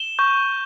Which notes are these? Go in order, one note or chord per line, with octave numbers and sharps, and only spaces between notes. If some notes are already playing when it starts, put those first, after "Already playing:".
Already playing: E7 G7
C#6 G6